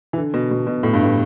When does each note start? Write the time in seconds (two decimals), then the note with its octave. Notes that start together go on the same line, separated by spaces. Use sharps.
0.13 E3
0.18 D3
0.34 B2
0.51 B2
0.67 B2
0.83 A2
0.94 G2
1.03 A2